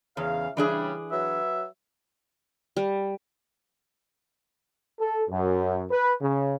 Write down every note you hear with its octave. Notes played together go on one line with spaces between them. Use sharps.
E2 C#3 F5
C#3 E3 G3 D4 G#4
F#3 B4 E5
G3
A4
F#2
B4
C#3